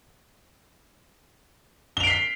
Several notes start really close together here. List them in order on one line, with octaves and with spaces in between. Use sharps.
G7 F7 D7 C7 B6